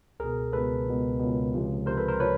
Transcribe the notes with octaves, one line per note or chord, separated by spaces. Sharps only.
C#2 B2 G#4 A#4
C#2 B2 A4 B4
C#2 B2
C#2 B2
C#2 C3 F3
C#2 C3 F3 A#4 C5
A4 B4
A#4 C5
C3 F3 B4 C#5